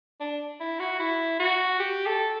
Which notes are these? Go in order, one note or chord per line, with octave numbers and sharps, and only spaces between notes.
D4
E4
F#4
E4
F#4
G4
A4